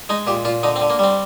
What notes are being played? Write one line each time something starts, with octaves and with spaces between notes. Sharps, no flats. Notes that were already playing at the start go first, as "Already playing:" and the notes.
G#3 D#4
A#2 G4
A#2 F4
D3 D#4
C4
D3
A#3
G3 C4